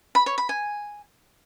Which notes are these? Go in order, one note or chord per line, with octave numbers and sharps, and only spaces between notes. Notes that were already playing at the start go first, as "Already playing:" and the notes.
B5
C#5
B5
G#5